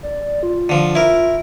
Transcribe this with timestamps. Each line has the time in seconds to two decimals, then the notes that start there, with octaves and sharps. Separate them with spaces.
0.03 D5
0.43 F4
0.69 D3 F3
0.95 E4 A#4